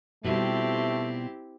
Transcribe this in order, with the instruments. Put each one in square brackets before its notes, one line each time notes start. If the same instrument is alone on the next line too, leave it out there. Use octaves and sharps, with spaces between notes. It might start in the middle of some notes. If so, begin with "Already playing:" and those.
[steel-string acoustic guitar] B2 G3 F4 [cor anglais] A3 [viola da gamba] C4 E4 G4